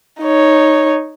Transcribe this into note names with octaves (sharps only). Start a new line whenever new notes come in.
D#4 C#5